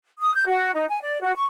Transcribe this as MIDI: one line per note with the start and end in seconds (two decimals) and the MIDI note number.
0.20 0.34 87
0.35 0.44 91
0.47 0.71 66
0.73 0.85 63
0.89 0.98 80
1.02 1.20 74
1.22 1.34 66
1.35 1.45 85